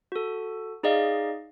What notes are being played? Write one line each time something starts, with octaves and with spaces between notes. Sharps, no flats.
F#4 A4
D#4 G#4 D5 D#5 F5